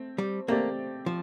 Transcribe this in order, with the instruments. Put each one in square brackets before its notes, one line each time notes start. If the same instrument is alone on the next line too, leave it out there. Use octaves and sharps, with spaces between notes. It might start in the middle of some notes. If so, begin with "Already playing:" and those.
Already playing: [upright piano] A3 C4
[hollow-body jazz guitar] G3
[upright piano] A3 C4 G4 D5 [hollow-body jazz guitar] A#3
[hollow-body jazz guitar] F3